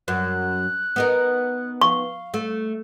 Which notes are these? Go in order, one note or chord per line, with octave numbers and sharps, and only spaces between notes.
F#2 F#6
B3 D#4 A#4
F5 C#6
A3